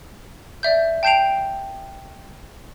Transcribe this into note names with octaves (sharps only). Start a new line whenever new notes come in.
D5 E5 G6
G5 A5 G6 C7 D7 F7